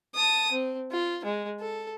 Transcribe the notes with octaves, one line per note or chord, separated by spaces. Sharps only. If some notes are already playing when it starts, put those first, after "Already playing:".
A5 D#6
C4
F4
G#3
A4